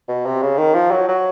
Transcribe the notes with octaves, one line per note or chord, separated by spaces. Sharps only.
B2
C3
C#3
D#3
F3
F#3
F#3